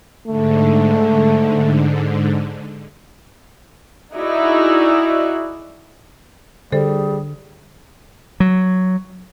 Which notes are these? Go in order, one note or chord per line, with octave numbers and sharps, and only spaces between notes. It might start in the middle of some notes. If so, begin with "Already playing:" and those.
G#2 D3 A3
D#4 E4 F#4 G#4 D5 E5
D3 G3 G#4 A4 C5
F#3